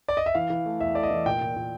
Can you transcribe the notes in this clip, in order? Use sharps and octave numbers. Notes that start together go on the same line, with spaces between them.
D5
D#5
E5
E3 F5
E3
A3
E2 E5
A3 D5
D#5
E3
A#2 G5
A#2
A#2